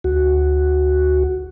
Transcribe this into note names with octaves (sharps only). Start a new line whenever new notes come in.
D2 F#4